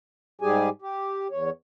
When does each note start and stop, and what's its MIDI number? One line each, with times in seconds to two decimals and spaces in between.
0.41 0.69 44
0.41 0.69 55
0.41 0.69 67
0.41 0.69 68
0.41 0.69 80
0.82 1.28 67
1.31 1.50 40
1.31 1.50 73